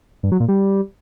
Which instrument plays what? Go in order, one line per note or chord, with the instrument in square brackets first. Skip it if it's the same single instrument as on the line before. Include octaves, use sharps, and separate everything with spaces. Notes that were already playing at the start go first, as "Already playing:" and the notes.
[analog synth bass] G2
F#3
A#2
G3